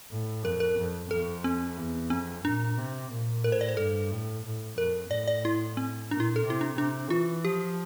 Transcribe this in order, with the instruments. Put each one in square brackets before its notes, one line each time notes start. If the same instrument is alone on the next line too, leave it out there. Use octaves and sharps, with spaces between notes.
[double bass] A2
[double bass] F2 [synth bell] A#4
[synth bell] A#4
[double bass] F2
[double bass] F2 [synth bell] A4
[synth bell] C4
[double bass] E2
[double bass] F2 [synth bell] C4
[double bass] A#2 [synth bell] D4
[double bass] C3
A#2
[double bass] A2 [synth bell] A#4
[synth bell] C5
D5
C5
[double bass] G2 [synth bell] A4
[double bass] A2
A2
[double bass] F2 [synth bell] A#4
[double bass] A2 [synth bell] D5
[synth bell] D5
E4
C4
[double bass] A#2 [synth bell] D4
[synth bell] E4
A4
[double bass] C3
[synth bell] E4
D4
[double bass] C3 [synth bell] D4
[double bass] E3 [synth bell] F4
[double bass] F3 [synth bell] G4